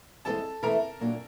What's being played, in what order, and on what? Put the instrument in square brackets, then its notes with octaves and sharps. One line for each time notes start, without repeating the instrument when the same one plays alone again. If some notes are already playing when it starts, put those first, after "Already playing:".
[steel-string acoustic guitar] G2 E3 G#3 C4 [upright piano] A4 A5
[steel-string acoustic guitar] E3 A3 C4 [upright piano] A#4 A#5
[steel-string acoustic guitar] A#2 F#3 A#3 D4